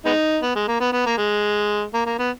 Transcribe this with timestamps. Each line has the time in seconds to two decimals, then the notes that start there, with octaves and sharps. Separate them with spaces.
0.05 G#3 B3 D#4
0.42 B3
0.55 G#3
0.68 A#3
0.80 B3
0.93 B3
1.06 A#3
1.18 G#3
1.94 A#3
2.06 A#3
2.19 B3